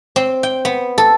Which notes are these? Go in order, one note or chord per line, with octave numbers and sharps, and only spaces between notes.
C4
G5
B3
A4